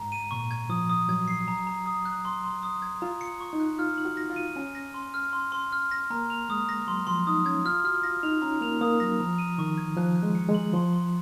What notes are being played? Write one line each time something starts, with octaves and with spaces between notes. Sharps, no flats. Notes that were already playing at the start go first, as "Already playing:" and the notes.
Already playing: G#2 A#5
D#7
A#2 C#6
G#6
F3 D#6
D#6
F#3 G#6
C7
A#5
A#5
D#6
F#6
C6
C6
D#6
G#6
F4 A#5
C#7
C#6
D#4
F#6
F4 F6
F#7
F#4
A#6
F4
D#7
C#4 G#5
A#6
C6
F6
C6
C6
F6
A#6
A#3 A#5
F7
G#3 D#6
A#6
F#3 C6
F3 C6
D#4 D#6
C#4 G#6
F4 F6
F#4 F6
F4 A#6
D#4 F7
C#4 A#5
A#3 F7
A#3 D#6
F#3 A#6
F3 A#5
D#7
D#3 C#6
G#6
F3 F#6
F#6
G#3
C#7
G#3
F#7
F3 C6
C6